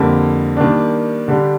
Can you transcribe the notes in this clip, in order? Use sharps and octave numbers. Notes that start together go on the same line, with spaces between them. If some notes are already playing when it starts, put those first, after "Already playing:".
Already playing: F2 D3 G3 A#3
D#3 G3 A#3 D4
D3 G3 D4 G4